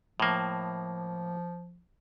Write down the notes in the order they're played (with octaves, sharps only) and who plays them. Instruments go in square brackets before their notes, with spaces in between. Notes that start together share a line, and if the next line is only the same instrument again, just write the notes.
[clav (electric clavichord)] A2 A#3 [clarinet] F3